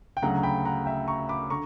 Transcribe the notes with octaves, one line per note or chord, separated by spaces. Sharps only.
G5
D2 C#3 F#3 F#5 A#5
A#5
G5 B5
F#5 A#5
E5 G5
A#5 C#6
B5 D6
D3 A#5 C#6